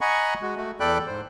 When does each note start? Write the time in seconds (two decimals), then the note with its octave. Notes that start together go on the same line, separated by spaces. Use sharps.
0.01 D#5 F#5 G#5 A#5 B5 C#6
0.42 G#3 F#4
0.57 A3 F#4
0.80 E2 A4 D5 G5 B5 F#6
1.07 G#2 C5